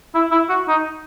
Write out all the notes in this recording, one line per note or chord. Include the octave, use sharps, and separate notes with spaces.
E4
E4
F#4
D#4